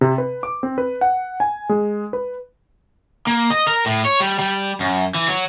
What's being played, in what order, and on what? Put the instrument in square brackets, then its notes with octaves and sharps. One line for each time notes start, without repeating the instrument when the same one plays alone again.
[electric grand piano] C3
B4
D6
C4
B4
F#5
G#5
G#3
B4
[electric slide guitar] A#3
D#5
A#4
A2
C#5
G3
G3
F#2
E3
F#3